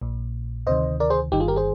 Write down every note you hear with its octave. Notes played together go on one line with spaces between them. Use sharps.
A#1 A#2
D2 C3 D#3 C5 D#5
A#4 D5
G#4 C5
G1 G2 D#3 D#4 G4
F4 G#4
G4 A#4
G#4 C5